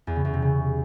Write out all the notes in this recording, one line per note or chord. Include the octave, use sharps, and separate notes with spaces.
E2
C#3
E2
C3
C#3